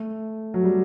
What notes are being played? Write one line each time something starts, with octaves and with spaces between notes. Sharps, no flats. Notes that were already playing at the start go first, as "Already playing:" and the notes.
Already playing: A3
F#3
G3